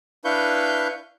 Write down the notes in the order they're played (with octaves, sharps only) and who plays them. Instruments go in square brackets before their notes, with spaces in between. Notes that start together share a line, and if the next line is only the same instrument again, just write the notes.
[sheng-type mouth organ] D4 E4 B4 F5 C#6 G6